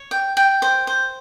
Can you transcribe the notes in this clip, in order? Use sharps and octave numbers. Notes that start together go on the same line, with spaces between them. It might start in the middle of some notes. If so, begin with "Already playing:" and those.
Already playing: C#5
G5
G5
C5
C5